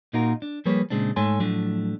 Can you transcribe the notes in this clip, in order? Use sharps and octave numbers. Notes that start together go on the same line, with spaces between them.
A#2 A#3 D#4 F4 F#4 A#4
D4
F3 G3 A#3 G#4 B4 C#5
A#2 C#3 G#3 C4 D4
G#2 A3 A4 C#5 G#5 C6
A2 F3 F#3 A3 D4